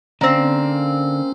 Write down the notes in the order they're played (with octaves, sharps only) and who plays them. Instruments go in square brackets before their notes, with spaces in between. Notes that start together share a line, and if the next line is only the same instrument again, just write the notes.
[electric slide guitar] D3 D5 [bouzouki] A#3 C4 [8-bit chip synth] C#4